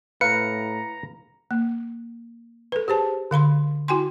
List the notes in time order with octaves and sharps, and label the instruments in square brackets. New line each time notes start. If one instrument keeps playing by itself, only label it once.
[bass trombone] A2 [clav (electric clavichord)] B4 F5 [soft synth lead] A#5 [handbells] C#7
[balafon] A#3
A4 B4
G4 G#4 C5 A5
D3 F5 B5 C6
E4 F#4 G5 G#5 C6